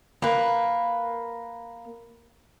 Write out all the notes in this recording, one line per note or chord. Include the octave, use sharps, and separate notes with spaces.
A#3 B4